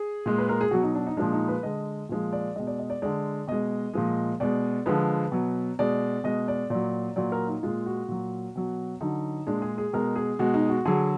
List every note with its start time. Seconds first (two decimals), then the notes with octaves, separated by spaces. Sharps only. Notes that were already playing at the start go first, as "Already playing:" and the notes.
Already playing: G#4
0.26 A#2 G#3
0.38 B4
0.49 A#4
0.61 G#4
0.71 B2 F#3 F#4
0.83 D#4
0.95 D4
1.07 D#4
1.17 A#2 F3 G#3 D4
1.33 D#4
1.48 B4
1.63 D3 G#3 D#5
2.09 A#2 F3 G#3
2.33 D5
2.56 B2 G#3 D#5
2.67 D5
2.79 D#5
2.90 D5
3.02 D3 G#3 D5
3.48 B2 G#3 D#5
3.93 A#2 F3 G#3
4.40 B2 G#3 D5
4.86 D3 F3 G#3 B4
5.32 B2 F#3
5.79 B2 G#3 D5
6.24 B2 G#3 D#5
6.48 D5
6.70 A#2 F#3 D5
7.16 A#2 F#3 D5
7.32 A#4
7.47 D#4
7.63 A#2 G#3 F4
7.86 F#4
8.08 A#2 F#3
8.56 B2 F#3
9.01 D3 F#3 D#4
9.47 A#2 G#3 D4
9.62 G#4
9.78 G#4
9.93 B2 G#3 A#4
10.16 G#4
10.39 B2 G#3 F#4
10.54 D#4
10.70 F#4
10.85 D3 F#3 G#4